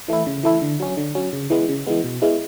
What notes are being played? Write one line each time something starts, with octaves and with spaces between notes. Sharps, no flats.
E3 A3 E4
C#3
E3 A3 E4
D3
F#3 C#4
D3
F#3 C#4
C#3
E3 G#3 B3
C#3
E3 G#3 B3
B2
G#3 B3 E4